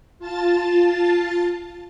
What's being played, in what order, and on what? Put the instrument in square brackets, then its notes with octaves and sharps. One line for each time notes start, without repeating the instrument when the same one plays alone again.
[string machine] F4 A5 A6